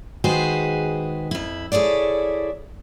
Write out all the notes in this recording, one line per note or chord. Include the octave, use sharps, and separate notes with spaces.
D#3 G#3 F#4 G#4 B4 C5
F2 E4
E4 G#4 A4 C#5 D5